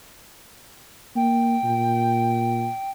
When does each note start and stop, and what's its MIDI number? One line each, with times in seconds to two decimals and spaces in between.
1.16 1.57 58
1.16 2.90 79
1.64 2.69 46